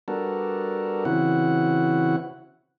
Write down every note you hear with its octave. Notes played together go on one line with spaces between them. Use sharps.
G3 B3 D4 F#4 A4 A#4
C#3 E3 C4 E4 F#4 F#5